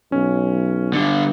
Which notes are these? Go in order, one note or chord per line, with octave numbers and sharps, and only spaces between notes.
B1 C#4
D3 G3